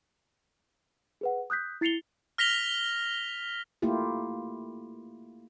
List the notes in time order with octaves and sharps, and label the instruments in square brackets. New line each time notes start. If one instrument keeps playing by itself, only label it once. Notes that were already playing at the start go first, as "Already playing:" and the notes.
[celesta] G#4 B4 F#5
D#6 F#6 G6 B6
E4 A6 C7 C#7 F7 G7
[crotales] F6 A#6 B6 F7 G7
[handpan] A3 A#3 E4 F4 G4